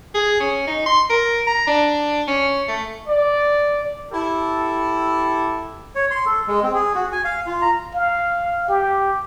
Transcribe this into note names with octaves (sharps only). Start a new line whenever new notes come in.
G#4
C#4
D#4
C6
A#4
A#5
D4
C#4
A3
D5
E4 G4 A4
C#5
C6
A4
G#3
C4
G#4
F#4
G#5
F5
F4
A#5
F5
G4